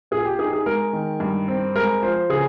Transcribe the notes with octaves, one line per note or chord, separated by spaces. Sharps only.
A#2 G#4
G4
D#4 G#4
G#4
G#3 A#4
D#3
G2
C4
G#3 A#4
F3 C5
C#3 G#4